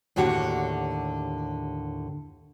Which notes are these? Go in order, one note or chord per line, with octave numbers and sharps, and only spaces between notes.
D#2 A2 D3 F#4 G4 F#5